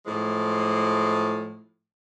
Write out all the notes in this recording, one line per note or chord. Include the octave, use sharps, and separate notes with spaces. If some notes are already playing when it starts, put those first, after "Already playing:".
A2 F3 G#3